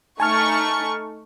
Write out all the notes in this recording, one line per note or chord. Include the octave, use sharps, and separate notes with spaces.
A3 D#4 G#5 A5 C#6 F6